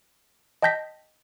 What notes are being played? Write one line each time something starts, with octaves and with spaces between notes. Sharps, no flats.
D#5 G5 A5 G6 A#6 B6